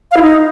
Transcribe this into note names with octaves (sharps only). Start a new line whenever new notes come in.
F5
E4
D#4